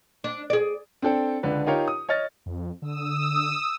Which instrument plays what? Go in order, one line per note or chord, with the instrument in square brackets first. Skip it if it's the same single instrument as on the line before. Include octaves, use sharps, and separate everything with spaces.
[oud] D4
G#4 D5
[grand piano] C4 D4 A4 G5
C#2 D3 B4
D#4 F4 G4 A#4 C#5 F5
D#6
C#5 D#5 F6 A6
[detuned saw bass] F2
[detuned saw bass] D3 [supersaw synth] D#6 E6